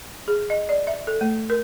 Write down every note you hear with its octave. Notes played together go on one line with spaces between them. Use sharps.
G#4
D#5
D5
E5
A4
A3
A#4